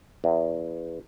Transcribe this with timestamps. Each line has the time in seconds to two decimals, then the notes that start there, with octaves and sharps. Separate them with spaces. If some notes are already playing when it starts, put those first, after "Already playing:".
0.24 E2